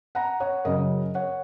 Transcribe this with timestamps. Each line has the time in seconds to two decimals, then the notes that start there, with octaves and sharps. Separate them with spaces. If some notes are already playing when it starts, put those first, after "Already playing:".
0.15 F#5 A#5
0.40 C#5 F#5
0.65 F#2 C#3 F#3 A#4 D#5
1.15 C#5 F#5